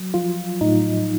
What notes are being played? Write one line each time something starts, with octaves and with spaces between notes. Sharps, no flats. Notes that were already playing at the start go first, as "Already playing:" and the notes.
Already playing: F#3
F3 F4
A2 D#4